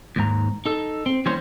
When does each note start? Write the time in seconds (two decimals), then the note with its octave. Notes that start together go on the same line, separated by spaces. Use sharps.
0.16 D#2 G#2 A#5
0.65 D#4 A4
1.06 C4
1.26 E3 G3 A#3 C#4 C5